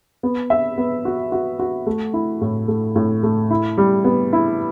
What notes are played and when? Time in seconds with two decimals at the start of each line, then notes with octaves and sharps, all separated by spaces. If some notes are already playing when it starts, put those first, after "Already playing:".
0.23 B3
0.50 E5
0.78 B3
1.05 F#4
1.32 F#4
1.59 F#4
1.87 A3
2.14 E4
2.41 A2
2.68 A3
2.96 A2
3.23 A3
3.51 E4
3.78 G3
4.04 B3
4.33 E4